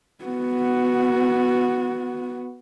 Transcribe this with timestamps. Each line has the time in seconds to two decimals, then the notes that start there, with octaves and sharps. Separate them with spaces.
0.24 B3 F#4